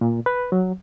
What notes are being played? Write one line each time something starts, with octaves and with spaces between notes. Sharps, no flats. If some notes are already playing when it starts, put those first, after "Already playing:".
A#2
B4
F#3